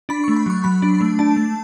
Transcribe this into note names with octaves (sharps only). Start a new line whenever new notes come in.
D4 B5
A3 C#6
B5
F#3 C#6
F#3 B5
D4
A3
D4 A5
A3